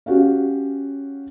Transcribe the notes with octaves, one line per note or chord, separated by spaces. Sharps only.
C#4 F#4 G4 F5